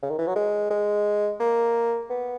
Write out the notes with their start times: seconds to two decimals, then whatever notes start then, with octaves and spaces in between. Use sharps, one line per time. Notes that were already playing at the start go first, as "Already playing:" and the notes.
0.02 C#3
0.10 D#3
0.18 E3
0.27 F#3
0.36 G#3
0.70 G#3
1.40 A#3
2.10 B3